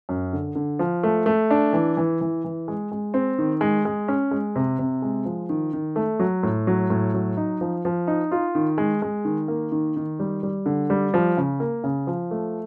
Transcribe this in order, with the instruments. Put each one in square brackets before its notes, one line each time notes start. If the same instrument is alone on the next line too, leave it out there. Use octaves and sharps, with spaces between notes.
[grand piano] F#2
D3
D3
F3
A3
A3
D4
E3
E3
E3
E3
G#3
G#3
C4
D#3
G#3
G#3
C#4
G#3
C3
C3
G#3
F3
D#3
D#3
A3
F#3
A2
F#3
A2
F#3
D#4
F3
F3
D#4
F4
D#3
G#3
G#3
D#3
A#3
D#3
D#3
G3
G3
D3
G3
F3
C#3
A#3
C#3
F3
A3